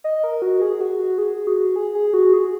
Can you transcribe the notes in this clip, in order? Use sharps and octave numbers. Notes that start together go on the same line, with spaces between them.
D#5
A#4
F#4
G#4
F#4
F#4
G#4
F#4
G#4
G#4
F#4
G#4